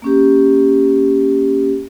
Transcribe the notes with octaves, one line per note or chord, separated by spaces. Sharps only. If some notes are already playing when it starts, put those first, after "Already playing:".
A#3 C#4 G4